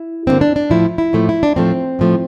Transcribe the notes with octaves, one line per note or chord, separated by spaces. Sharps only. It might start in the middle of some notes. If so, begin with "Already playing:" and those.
Already playing: E4
G2 D3 G3 A#3 C4
D4
D4
A2 F3 A3 E4
E4
A2 F3 A3
E4
D4
A2 F3 A3 C4
A2 F3 A3